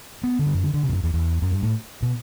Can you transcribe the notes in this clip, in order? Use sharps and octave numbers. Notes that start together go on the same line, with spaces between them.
B3
D3
G2
F#2
D3
D3
C3
E2
F#2
E2
E2
F#2
G2
A2
B2